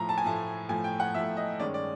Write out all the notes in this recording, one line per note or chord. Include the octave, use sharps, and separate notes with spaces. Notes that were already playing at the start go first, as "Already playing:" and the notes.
Already playing: A2 F3 A3 A#5
A5
G#5
A2 F3 A3 A5
A2 F3 A3 G#5
G5
F#5
A2 F3 A3 E5
D#5
G2 D#3 G#3 C#4 D5
D5